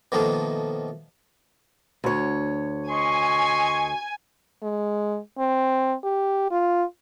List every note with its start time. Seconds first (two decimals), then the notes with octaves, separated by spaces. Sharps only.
0.12 B2 D#3 F3 A3 A#3
2.04 D2 C#5
2.90 D#5 G#5 C6 C#6
4.62 G#3
5.39 C4
6.04 G4
6.51 F4